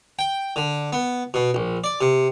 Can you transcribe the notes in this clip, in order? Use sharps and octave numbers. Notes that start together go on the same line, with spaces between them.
G5
D3
B3
B2
A#1
D5
C3